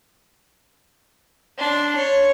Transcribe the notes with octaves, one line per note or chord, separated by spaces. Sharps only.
D4 C6
C#5